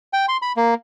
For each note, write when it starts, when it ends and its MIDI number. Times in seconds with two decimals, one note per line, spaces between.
0.13 0.26 79
0.28 0.37 84
0.42 0.52 83
0.57 0.74 58